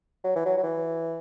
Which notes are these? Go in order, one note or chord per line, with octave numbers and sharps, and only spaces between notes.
F#3
E3
F#3
F#3
E3